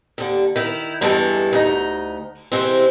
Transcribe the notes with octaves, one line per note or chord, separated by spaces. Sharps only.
D#2 D3
D#3 E4
E2 G2 E3 G#3 A4 A5
D2 D#4
C3 E3 G#3 C4